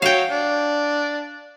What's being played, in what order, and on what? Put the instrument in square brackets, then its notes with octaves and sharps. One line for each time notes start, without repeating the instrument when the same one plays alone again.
[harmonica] F#4 C#5 [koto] F5 G5
[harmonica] D4